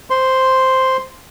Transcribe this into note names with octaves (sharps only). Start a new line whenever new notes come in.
C5 C6